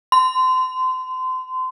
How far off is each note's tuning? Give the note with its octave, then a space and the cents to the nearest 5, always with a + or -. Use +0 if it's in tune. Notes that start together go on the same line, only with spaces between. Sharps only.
C6 -30